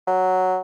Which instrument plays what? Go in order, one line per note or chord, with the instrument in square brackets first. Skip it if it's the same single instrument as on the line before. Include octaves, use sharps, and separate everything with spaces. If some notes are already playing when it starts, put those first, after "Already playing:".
[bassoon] F#3